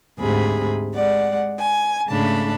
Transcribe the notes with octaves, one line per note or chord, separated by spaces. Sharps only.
D2 G#2 C3 G#4 B5
G#3 D5 F#5
G#5
G#2 C#3 A3 D4 A5 B5